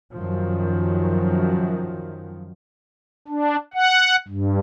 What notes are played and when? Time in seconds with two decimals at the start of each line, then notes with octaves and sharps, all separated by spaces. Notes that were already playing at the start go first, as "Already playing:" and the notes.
0.12 F#2 D#3 F3
3.28 D4
3.74 F#5
4.28 G2